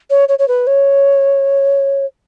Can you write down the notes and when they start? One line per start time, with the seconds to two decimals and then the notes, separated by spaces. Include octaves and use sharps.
0.10 C#5
0.28 C#5
0.39 C#5
0.48 B4
0.67 C#5